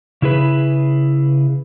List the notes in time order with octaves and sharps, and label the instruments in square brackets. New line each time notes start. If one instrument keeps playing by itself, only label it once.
[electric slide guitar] C#3 E4 G#4 B4